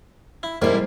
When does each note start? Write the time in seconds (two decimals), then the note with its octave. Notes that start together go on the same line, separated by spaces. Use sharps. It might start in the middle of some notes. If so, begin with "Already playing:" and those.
0.43 E4
0.62 G#2 C3 G3 A#3 E4